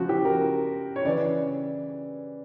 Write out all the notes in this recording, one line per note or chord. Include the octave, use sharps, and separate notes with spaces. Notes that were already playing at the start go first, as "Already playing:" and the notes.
Already playing: C#3 F3 F#4
G4
A#4
C#5
C#3 E3 D5